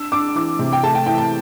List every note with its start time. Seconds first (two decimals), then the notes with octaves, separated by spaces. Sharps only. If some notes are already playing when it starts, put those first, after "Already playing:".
Already playing: D4 E6
0.12 D4 D6
0.36 E3 D6
0.59 C3
0.73 G5
0.83 A3 A5
0.95 G5
1.06 E3 G5
1.18 A5